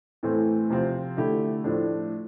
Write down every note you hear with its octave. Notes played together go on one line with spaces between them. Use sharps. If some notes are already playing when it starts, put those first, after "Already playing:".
A2 E3 A3 C4
C3 F3 C4 F4
D3 A3 E4 G4
A2 F3 A3 D4